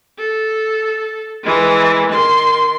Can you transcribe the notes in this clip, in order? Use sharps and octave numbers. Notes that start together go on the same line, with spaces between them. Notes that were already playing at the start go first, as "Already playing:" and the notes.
A4
E3 G#3
D#3 C6